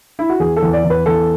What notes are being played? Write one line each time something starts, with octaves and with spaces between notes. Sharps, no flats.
E4
F#4
E2 G#4
A4
E2
D5
E2
B4
E2 A4